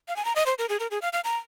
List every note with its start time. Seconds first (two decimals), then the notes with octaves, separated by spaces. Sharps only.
0.08 F5
0.16 G#5
0.25 A#5
0.36 D#5
0.46 C5
0.59 A#4
0.69 G#4
0.80 A#4
0.91 G#4
1.02 F5
1.13 F5
1.24 A#5